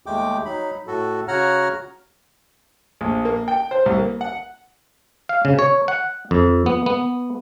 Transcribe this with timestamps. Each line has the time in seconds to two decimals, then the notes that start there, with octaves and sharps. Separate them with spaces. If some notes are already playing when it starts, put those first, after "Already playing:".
0.06 D#2 G#3 A3 G5 D6
0.45 F#3 D#4 B5
0.87 A2 F#4 A4
1.28 C#3 F#4 C#5 F#5 A#5 F6
3.01 A#1
3.25 A#3
3.48 G5
3.71 C5
3.86 C2
3.98 A#3
4.21 F#5
5.29 F5
5.45 C#3
5.59 C#5
5.88 F#5
6.31 F2
6.66 B3
6.86 B3